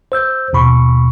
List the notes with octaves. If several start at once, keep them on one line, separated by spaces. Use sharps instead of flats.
C5 E6 G6
D#2 B2 B5 C#6